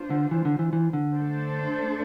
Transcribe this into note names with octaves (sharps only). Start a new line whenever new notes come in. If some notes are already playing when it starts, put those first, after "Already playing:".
Already playing: B3 D4 F4 C5
D3
E3
D3
E3
E3
D3
A3 D4 A4 C5